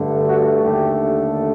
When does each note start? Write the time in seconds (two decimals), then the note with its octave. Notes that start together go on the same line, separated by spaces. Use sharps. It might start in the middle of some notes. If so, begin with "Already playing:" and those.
Already playing: G2 D3 A3
0.26 F#4
0.63 D#2 D3 A3 G4